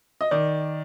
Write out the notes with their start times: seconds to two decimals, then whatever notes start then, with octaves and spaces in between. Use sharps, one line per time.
0.21 D#5
0.31 D#3 D5